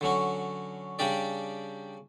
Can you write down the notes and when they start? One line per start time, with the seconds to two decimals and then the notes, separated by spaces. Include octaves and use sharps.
0.01 D3 F#3 C#4 F#4
0.99 C#3 G3 D4 G4 D5